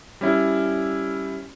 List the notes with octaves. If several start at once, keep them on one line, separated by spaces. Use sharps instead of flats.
G3 C#4 E4